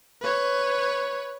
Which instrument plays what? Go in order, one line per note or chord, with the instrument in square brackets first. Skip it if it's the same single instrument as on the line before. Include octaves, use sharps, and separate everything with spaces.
[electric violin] B4 C#5